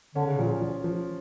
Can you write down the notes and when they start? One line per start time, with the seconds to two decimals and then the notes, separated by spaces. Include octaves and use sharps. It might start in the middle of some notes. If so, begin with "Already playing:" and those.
0.15 D3 C#4
0.26 C#3
0.38 A#2 F3
0.61 F3
0.84 F3